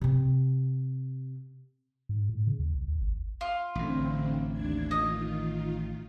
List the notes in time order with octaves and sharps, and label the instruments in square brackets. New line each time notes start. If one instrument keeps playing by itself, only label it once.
[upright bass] C3 C4
[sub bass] G#2
A2
C#3
D#2
C2
D#2
G#1
[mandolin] F4
[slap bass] A1 A2 [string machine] D3 C4
[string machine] D#2 D4 G#6
[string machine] D#3 F4 [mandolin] D#5